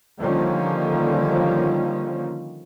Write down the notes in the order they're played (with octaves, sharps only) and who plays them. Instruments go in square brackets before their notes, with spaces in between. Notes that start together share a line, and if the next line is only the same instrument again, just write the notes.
[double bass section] D3 D#3 F3 G3 A#3 C#4